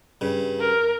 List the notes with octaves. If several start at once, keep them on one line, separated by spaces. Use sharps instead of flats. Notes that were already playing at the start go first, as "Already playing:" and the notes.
G2 C#3
A#4